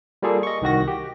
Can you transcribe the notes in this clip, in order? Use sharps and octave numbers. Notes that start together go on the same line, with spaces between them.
G3 A#3 F4 G#4 A4
D#5 C#6
C2 D#3 F#4 A#6
G4